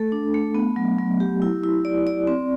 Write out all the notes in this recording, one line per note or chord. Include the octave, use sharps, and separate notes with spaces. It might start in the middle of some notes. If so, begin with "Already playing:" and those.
Already playing: A3 A4
D4
A3
B3
F#3
F#3
G4
E4
E4
D5
D5
C4